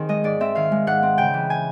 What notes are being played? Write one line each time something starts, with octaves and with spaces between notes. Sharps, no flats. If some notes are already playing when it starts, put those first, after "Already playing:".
Already playing: D#3 C4 G#4
G#3 D#5
G#2 D5
C4 E5
D#3 F5
G#3
G#2 F#5
C4
C#3 G5
E3
G#5